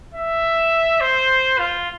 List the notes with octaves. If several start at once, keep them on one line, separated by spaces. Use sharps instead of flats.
E5
C5
F4